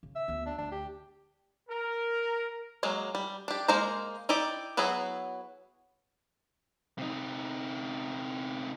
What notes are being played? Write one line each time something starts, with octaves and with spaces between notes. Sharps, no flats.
C#3
E5
D2 B3
D4
D2 D4
G4
A#4
F#3 G#3 A#3
G3
D4 G4
G#3 A#3 A#4 C5 A#5
D#4 E4 G4 D5
F#3 B3 E4 F#4 G#4
C3 D#4